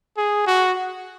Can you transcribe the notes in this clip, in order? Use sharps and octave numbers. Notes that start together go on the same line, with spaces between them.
G#4
F#4